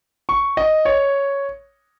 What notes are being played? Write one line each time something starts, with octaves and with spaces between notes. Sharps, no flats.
C#6
D#5
C#5